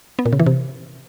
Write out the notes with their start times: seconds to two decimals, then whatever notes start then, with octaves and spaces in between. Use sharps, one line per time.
0.19 B3
0.26 A#2
0.33 C#3
0.39 E3
0.46 C3